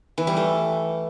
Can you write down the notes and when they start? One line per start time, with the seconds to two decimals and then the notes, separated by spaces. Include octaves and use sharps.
0.18 E3
0.27 G3
0.37 A3